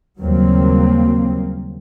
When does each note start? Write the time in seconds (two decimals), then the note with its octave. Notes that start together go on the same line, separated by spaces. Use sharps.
0.20 D#2 C#3 F#3 G3 A#3 C4